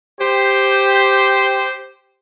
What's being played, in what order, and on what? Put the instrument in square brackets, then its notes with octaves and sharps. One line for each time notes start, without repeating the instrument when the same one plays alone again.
[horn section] G4 C5